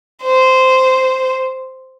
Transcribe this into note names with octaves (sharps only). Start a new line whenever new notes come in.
C5